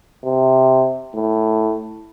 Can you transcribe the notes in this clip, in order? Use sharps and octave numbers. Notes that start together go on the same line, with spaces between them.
C3
A2